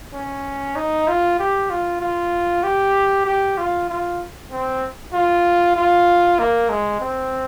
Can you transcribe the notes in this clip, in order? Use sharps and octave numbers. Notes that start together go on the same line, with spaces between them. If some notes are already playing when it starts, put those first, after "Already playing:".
C#4
D#4
F4
G4
F4
F4
G4
G4
F4
F4
C4
F4
F4
A#3
G#3
C4